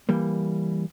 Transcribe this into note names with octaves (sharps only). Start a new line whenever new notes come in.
E3 G3 A#3